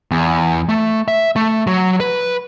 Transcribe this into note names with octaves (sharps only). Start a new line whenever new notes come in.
E2
A3
E5
A3
F#3
B4